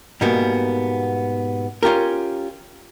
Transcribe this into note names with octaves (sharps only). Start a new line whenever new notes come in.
G#2 B2 G3 A#3 B3
C#4 F4 G4 A#4